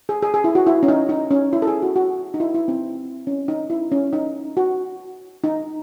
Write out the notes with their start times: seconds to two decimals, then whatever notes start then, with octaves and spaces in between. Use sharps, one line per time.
0.09 G#4
0.22 G#4
0.34 G#4
0.44 E4
0.55 F#4
0.67 E4
0.83 C#4
0.88 D#4
1.09 D#4
1.31 C#4
1.53 E4
1.62 A4
1.67 G#4
1.82 F#4
1.96 F#4
2.34 D#4
2.40 E4
2.54 E4
2.68 C4
3.27 C#4
3.48 D#4
3.70 E4
3.92 C#4
4.13 D#4
4.57 F#4
5.44 D#4